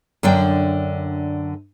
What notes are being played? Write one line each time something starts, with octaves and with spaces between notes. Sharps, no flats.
F#2 D3 D4 D5 G5